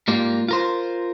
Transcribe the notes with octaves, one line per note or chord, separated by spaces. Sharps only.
G#2 G3 A#3 F4
F4 A#4 C5